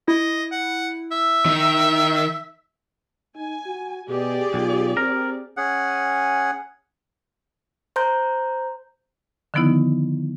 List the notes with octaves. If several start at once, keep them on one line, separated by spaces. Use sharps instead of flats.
E4 D#5
F#5
E5
D#3
D#4 G#5
F#4
B2 G4 G#4 D5
B1 F4
C4 A#4
C#4 G#4 F#5
C5 A#5 C6 G6
D3 D#3 F3 B3 D#4 E4